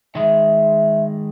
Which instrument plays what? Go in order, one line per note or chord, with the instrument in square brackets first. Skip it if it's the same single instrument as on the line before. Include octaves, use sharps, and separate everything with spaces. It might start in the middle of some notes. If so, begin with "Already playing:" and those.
[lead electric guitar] D#3 G#3 [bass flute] E5